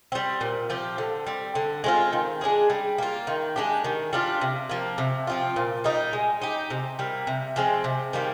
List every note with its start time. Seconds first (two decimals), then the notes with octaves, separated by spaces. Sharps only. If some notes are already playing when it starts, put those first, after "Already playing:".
0.12 G3 C4
0.41 A#2
0.70 F3 C4 G4
0.98 D3
1.27 G3 C4
1.55 D3
1.84 G#3 C4 F4
2.13 D#3
2.41 G#3 D4 G#4
2.70 G3
2.98 A#3 F4
3.27 D#3
3.56 G#3 D4 G4
3.84 D#3
4.13 G3 D4 F4
4.41 C3
4.69 F3 A#3
4.98 C3
5.27 F3 C4 F4
5.56 A#2
5.84 G3 A#3 D#4
6.13 G#3
6.42 D#4 G4
6.70 C3
6.99 G3 A#3
7.27 C3
7.56 F3 G#3 C4
7.84 C3
8.13 D#3 G3 A#3